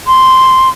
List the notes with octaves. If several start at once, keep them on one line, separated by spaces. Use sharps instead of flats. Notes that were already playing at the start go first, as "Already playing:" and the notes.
C6